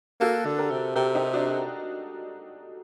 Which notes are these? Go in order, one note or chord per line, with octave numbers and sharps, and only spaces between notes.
A#3 F#4 A4
D3
G4 A#4
C3
C3 G4 A#4
D#4 G4
D4 F#4